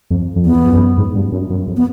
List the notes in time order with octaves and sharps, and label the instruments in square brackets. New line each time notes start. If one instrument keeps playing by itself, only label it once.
[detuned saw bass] F2
F2
[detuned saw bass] E2 [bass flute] B3
[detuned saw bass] F2
F#2
G#2
G2
F#2
F#2
F2
[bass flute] B3